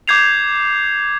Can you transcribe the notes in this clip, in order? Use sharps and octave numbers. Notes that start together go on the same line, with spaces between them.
D6 G6 G#6 C7 F7